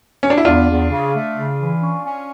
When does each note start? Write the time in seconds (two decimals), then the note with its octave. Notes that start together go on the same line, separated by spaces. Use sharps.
0.23 C#4
0.30 D4
0.38 E4
0.45 E2 D4 F4
0.69 E2
0.90 C#3
1.14 A3
1.37 C#3
1.60 E3
1.82 C#4
2.05 C#4